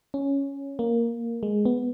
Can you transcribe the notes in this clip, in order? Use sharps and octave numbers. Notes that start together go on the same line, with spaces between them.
C#4
A#3
G#3
B3